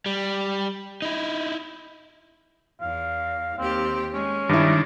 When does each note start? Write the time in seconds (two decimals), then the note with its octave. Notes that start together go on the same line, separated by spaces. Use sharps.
0.06 G3
1.02 D#4 E4
2.81 E2 F5
3.58 D#2 C4 G4
4.14 G#3 C#4
4.49 G2 D#3 D4 E4